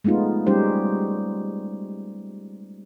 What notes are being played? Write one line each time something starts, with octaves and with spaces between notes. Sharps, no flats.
G#3 A3 B3 D#4 F4
G3 G#3 C#4 D#4 G4 C5